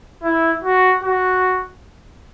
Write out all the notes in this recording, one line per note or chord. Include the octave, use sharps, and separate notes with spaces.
E4
F#4
F#4